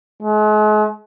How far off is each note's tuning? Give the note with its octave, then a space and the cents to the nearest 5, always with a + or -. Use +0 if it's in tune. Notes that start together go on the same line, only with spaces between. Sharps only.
G#3 +40